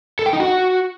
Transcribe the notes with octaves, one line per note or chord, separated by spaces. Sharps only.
A4
G5
D#4
F#4